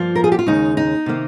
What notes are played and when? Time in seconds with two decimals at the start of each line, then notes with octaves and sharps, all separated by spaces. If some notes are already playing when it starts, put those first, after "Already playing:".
Already playing: G2 F3 A#3 F4
0.16 A#4
0.24 G#4
0.32 G4
0.39 F4
0.46 D#2 C#3 G#3 D#4
0.77 D#4
1.06 C3 D#3 A#3